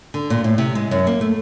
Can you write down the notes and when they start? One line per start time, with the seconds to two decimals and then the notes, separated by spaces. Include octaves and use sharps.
0.14 D3
0.30 A#2
0.44 A2
0.58 C3
0.75 G#3
0.91 F#2
1.07 A#3
1.21 A3